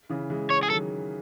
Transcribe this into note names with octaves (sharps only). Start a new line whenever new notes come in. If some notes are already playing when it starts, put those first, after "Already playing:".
C#3 E3
E3 G#3
C#5
G#4
D#3 F#3 A4